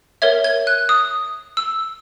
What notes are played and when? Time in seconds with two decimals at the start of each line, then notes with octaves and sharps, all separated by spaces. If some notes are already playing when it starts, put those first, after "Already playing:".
0.22 A#4 C#5 E5 G#6
0.44 G#6
0.67 F#6
0.89 D#6
1.57 E6